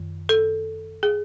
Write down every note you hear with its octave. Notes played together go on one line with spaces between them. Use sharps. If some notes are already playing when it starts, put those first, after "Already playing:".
Already playing: F#2 D#3
A4
G#4